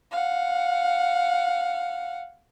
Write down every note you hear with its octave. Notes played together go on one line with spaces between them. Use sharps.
F5 F#5